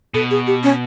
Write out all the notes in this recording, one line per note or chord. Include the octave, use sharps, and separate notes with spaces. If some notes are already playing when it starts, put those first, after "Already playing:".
B2 A4
G#4
G4
C#4